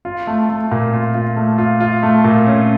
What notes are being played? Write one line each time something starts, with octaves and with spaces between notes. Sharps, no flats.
F4
A3
A3
A#2
F4
F4
A3
F4
F4
A3
A#2
C#4